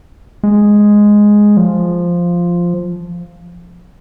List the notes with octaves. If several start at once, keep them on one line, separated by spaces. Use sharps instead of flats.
G#3
F3